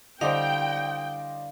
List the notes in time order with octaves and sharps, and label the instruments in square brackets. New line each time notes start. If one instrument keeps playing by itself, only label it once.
[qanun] D3 G3 E4 [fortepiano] C5 D5 D#5 [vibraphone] F5 [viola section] G5